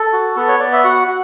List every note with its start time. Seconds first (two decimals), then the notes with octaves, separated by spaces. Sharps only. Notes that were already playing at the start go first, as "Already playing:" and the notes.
Already playing: A4
0.13 F#4
0.36 B3 A4
0.48 C#5
0.60 B3 D5
0.73 E5
0.84 F#4 F#5
1.08 F#4